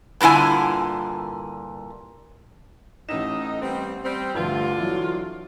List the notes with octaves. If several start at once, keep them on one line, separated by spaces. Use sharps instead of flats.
G2 A#2 D3 E4 G#5
A1 A2 D#4 E7
G3 B3 C4
G3 C4
D2 G2 D3 F4
E3 F#3